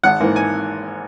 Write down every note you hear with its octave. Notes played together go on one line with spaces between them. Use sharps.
G#1 F#5
G#2 E3 A#3
G#5